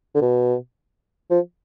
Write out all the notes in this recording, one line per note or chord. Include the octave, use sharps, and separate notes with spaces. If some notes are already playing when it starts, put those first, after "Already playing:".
D3
B2
F3